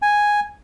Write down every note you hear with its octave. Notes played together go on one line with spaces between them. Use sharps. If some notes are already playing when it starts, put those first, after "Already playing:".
G#5